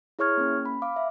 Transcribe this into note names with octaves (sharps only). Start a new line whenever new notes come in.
E4 G#4 C#5 C#6 F6 G#6
A#3 C#4
B5
F5 D6
E5